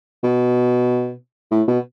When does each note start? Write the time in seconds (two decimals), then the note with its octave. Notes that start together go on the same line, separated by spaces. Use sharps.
0.23 B2
1.51 A2
1.68 B2